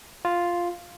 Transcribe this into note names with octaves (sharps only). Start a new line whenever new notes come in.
F4